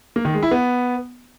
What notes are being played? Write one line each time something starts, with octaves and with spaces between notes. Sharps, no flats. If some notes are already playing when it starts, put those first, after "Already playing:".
A#3
D#3
G#3
E4
B3